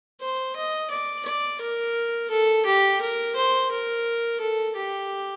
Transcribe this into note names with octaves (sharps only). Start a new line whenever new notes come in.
C5
D#5
D5
D5
A#4
A4
G4
A#4
C5
A#4
A4
G4